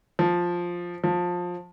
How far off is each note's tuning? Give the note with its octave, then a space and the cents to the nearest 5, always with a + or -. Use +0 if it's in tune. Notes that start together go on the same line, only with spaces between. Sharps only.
F3 +5
F3 +20